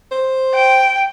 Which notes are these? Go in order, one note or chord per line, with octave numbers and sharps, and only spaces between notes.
C5
G5